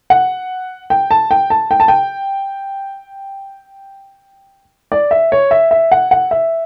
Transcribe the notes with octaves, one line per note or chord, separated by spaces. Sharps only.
F#5
G5
A5
G5
A5
G5
A5
G5
D5
E5
C#5
E5
E5
F#5
F#5
E5